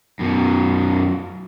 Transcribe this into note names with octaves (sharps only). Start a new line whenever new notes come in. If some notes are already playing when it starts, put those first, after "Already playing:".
F#2 B2